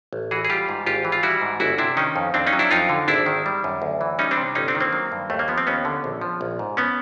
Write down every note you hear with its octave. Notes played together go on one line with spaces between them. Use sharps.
A1
E3 F#4 G#4
G#4
G3 F4 G4
G#2
G#1 F4 G4
E3
F4
G3 E4 F#4
G#2
G1 E4 F#4
C3 D4 E4
D#3 C#4 D#4
F2
F2 C4 D4
C#4 D#4
F#3
D4 E4
F2 D#4 F4
D3
G#1 D4 E4
D#3
G3
F#2
D2
E3
G3 C#4 D#4
C4 D4
C3
G1 C#4 D#4
C4 D4
D#3
A#3 C4
F#3
G2
D#2 A3
A#3
F3 B3
C4
D#2 B3 C#4
D3
A#1
F3
A#1
G#2
B3 C#4